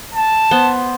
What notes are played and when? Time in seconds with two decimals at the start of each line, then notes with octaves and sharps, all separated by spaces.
0.15 A5
0.51 B3 C5